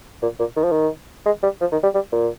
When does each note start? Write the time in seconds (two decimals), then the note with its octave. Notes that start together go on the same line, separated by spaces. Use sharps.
0.22 A#2
0.40 A#2
0.57 D#3
0.64 F3
0.72 D#3
1.26 G#3
1.43 G3
1.61 F3
1.72 D#3
1.83 G3
1.94 G3
2.12 A#2